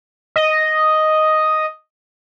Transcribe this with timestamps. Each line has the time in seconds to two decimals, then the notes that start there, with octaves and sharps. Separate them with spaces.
0.36 D#5